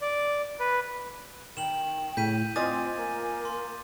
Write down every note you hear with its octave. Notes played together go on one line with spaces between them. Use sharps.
D5
B4
D#3 G5 E7 F#7
A2 C#3 G6 B6 D#7
C4 F4 C5 D#5 G#5 D6 D#6 A6
A#3
C6